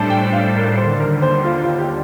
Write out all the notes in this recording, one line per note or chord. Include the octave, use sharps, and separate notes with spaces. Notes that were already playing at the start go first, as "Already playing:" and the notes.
Already playing: A2 G3 D4 A4 C5 A5
G5
F5
A#4
D#2 D3 G3 C5
A#4
C5
F4
F4
G4